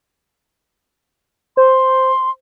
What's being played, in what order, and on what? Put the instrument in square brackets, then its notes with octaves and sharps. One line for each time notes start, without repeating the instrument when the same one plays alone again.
[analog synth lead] C5 [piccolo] C6